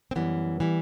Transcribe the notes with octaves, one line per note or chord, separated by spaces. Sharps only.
C4
F#2 E3 G3 B3
E3 G3